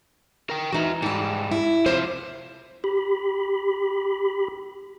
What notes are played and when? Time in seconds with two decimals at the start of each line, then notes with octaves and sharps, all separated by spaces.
0.50 A#4 G5
0.72 E3 D#4 F#4 E5
1.02 G#2 G3 G4 A5
1.52 E4
1.86 C3 F3 C5
2.84 G4 B5